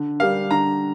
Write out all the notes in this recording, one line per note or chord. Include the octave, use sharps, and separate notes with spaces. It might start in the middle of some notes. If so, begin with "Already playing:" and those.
Already playing: D3
G3 D4 G4 A#4 F5
D3 A#5